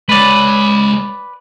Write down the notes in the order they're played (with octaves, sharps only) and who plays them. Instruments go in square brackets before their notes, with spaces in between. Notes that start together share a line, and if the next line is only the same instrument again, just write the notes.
[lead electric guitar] G#3 C#5 [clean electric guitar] B4 D5